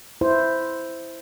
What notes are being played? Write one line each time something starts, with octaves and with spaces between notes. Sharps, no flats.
E4 C5